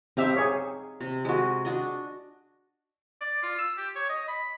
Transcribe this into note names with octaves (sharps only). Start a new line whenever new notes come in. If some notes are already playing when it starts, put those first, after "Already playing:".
C4 D#4 G4 E5 F5
G#4 C#5
C3
G#3 F#4
D4 F#4 D#5
D5
F4
E6
G4
C#5
D#5
B5